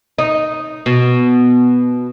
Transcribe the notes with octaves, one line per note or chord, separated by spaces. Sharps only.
D#4
B2